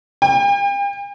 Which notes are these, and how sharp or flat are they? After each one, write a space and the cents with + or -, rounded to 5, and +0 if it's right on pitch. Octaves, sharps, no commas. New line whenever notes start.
G5 +45